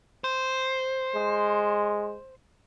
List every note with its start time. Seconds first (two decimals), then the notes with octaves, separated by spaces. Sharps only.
0.24 C5
1.15 G#3